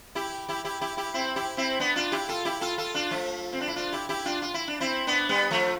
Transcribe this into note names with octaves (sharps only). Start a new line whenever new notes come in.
E4 G4
E4 G4
E4 G4
E4 G4
E4 G4
C4 E4
E4 G4
C4 E4
B3 D4
D4 F4
E4 G4
F4 A4
E4 G4
F4 A4
F4 A4
D4 F4
F3 A3
C4
D4
E4
D4 F4
E4 G4
E4 G4
D4 F4
F4
E4
D4
C4 E4
B3 D4
G3 B3
F3 A3